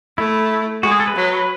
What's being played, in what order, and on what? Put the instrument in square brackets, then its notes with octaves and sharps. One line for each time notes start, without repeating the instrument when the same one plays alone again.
[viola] A3 [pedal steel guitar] E4
[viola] G#3 [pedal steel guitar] F#4
[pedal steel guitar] G#4
A4
B4
[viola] F#3